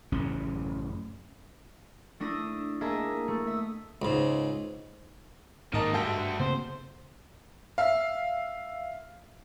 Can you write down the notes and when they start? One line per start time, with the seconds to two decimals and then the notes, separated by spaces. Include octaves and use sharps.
0.12 A1 F#2 C#3 C#4
2.20 A3 D4 E4 D#6 A#6
2.81 A#3 E4 G#4 D#5 E5 A5
3.28 A3
3.47 E5 D#6
4.02 C#2 G#2
5.73 G#2 D#3 A#3 A#4 D#5 A5
5.93 G2 A3 F#4 A4 G5
6.40 C#3 A#3 C4 C5
7.78 E5 F5